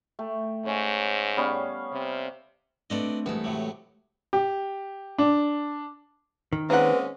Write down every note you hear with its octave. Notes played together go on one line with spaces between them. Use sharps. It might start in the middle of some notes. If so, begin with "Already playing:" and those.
A3 G5
G#2 C#4
G3 B3 C#4 F5
C3
A3 C4 D4 B4 D5 D#5
C2 E3 G#3 A3 B3
A2 C3 F#3
G4
D4
D#3
G#3 A#3 C4 C#4 B4 F#5